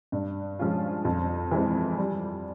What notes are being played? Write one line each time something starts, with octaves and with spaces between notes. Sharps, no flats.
G2
F3 G#3 C#4 F4
F2
E3 G#3 C4
G3